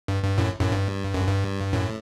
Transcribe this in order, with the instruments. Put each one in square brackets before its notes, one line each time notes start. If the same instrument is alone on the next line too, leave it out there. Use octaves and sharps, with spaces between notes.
[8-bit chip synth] G2
G2
F#2 A2
F#2 A2
G2
F#2
G2
F#2 A2